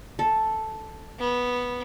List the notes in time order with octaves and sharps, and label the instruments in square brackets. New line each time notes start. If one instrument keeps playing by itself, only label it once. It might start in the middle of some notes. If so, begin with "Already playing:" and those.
[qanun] A4
[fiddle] B3